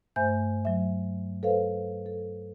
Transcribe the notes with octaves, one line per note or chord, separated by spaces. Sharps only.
G2 A3 C5 E5 G#5 G6
F#3 E5
A4 B4 C5 F5
A4